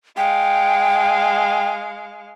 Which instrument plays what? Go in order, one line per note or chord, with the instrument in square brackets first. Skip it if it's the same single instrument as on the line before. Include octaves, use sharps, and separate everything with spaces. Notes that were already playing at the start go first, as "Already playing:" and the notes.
[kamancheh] G#3 F5 [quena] G5